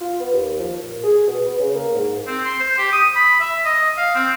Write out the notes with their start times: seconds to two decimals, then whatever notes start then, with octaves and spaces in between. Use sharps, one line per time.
0.01 F4
0.20 B3
0.33 D#2
0.60 F3
0.83 A#2
1.03 G#4
1.27 B2
1.45 B3
1.59 C#3
1.75 A#3
1.95 G#2
2.27 C4
2.45 C6
2.60 C5
2.78 G4
2.92 D#6
3.16 B5
3.40 E5
3.65 D#5
3.97 F5
4.15 C4